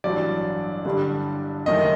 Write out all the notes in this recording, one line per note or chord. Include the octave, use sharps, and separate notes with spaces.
A1 G2 F#3 D5
G2 D3 G3
F#1 F#2 D#3 A3 D#5